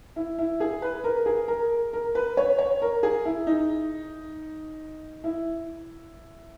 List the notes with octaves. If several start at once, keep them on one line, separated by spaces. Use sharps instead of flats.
E4
E4
G#4
B4
A#4
G#4
A#4
A#4
B4
C#5
C#5
A#4
G#4
E4
D#4
E4